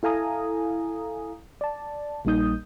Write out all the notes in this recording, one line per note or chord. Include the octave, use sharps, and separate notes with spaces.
E4 A4 F5 G#5 A#5 D#6
D5 A5
A#1 G3 A#3 D#4 D#6 G6